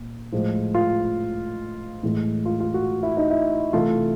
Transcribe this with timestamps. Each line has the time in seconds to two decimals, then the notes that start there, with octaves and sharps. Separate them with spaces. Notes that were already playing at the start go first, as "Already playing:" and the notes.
Already playing: A#2
0.32 A2 F3 G#3
0.75 F4
2.03 A2 E3 G#3
2.45 F4
2.60 F4
2.74 F#4
3.03 E4
3.17 D#4
3.30 E4
3.73 C3 E3 A3 F4